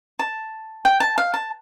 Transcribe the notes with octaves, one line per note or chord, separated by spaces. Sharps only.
A5
G5
A5
F5
A5